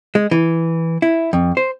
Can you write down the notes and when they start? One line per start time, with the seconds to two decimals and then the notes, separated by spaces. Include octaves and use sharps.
0.15 G#3
0.31 E3
1.02 E4
1.33 F2
1.57 C5